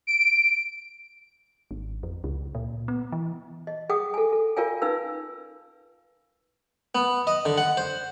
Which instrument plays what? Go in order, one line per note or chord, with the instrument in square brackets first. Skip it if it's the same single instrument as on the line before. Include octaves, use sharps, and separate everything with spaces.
[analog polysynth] D7
[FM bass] G#1
F2
C#2
A#2
B3
E3
[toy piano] D#5
G#4 F#5 G5 D6 D#6
A4 G#5
A4
F4 A#4 D5 F5 G5 G#5
C#4 D#4 B4 F5 E6
[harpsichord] B3
D#5
D3
F#5
C5